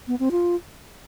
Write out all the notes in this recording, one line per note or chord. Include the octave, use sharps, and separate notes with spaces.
B3
C4
F4